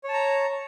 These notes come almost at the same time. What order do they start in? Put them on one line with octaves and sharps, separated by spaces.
C#5 A5 A#5